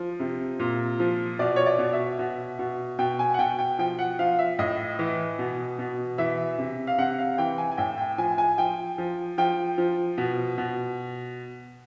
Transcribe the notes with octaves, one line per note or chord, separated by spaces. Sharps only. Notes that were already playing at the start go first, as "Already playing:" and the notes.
Already playing: F3
C3
A#2
F3
B2 D5
C#5
D5
B2
E5
B2
B2
B2 G5
G#5
F#5
B2 G5
G5
F3 G5
F#5
F3 F5
E5
A2 D#5
E3
B2
B2
E3 E5
C3
F5
C3 F#5
F5
E3 G5
G#5
G#5
A2 G5
G5
F3 G#5
G#5
F3 G5
F3
F3 G5
F3
B2
B2